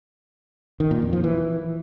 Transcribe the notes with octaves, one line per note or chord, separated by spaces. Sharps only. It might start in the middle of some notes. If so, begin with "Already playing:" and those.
D#3
A#2
F2
F3
E3